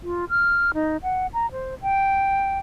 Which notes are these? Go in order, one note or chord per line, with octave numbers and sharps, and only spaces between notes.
F4
F6
D#4
F#5
A#5
C5
G5